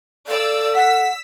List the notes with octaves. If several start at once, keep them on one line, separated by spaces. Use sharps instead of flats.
A4 D5 F5 E6
F#5 E6 B6